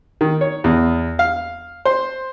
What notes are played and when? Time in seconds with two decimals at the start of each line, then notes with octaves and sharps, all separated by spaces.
0.21 D#3
0.41 C#5
0.64 E2
1.19 F5
1.85 C5